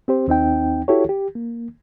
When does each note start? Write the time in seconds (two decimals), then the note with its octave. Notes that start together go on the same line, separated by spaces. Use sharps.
0.08 C4 G4 C5
0.28 D#2 C4 D#4 G5
0.88 E4 F#4 G4 A4 C#5
1.09 G4
1.35 A#3